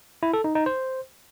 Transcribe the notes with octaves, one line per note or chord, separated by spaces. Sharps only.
E4
A4
D#4
D#4
C5